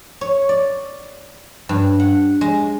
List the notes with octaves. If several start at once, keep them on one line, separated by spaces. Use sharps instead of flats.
C#5
D5
G2
F#5
G#3